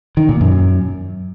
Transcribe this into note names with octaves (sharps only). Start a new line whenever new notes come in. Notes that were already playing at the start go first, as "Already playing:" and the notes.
D#3
A#2
F#2